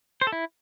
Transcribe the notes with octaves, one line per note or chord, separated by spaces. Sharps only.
C5
A4
E4